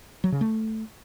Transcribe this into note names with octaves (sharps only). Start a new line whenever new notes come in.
F#3
C#3
A3